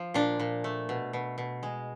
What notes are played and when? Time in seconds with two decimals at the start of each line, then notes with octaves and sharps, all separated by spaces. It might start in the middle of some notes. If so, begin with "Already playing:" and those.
Already playing: F3
0.14 A#2 D4
0.39 A#2
0.64 A3
0.89 B2
1.13 B2
1.38 B2
1.63 G#3